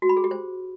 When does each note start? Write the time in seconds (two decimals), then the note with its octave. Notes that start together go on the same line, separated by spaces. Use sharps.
0.02 F#4
0.09 B5
0.17 G#4
0.24 G4
0.31 C5